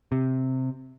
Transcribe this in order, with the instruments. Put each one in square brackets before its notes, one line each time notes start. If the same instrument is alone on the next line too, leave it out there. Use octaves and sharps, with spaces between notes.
[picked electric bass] C3